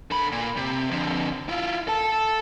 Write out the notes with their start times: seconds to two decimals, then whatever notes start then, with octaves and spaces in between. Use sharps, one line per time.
0.11 D3 B5
0.32 A#2
0.57 C3
0.91 F2 D3
1.49 E4 F4
1.88 A4 A5